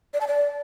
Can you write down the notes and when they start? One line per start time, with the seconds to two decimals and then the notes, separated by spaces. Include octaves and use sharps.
0.14 D5
0.21 A5
0.27 D5